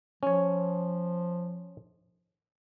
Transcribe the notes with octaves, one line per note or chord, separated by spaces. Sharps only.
F3 C#4 C#5